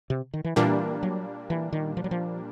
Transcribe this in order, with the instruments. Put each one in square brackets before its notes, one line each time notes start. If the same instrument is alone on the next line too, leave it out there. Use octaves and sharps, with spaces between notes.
[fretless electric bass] C3
D#3
E3
[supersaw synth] A#2 G3 A#3 D4 [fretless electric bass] E3
[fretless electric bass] F#3
E3
D#3
F3
F#3
F3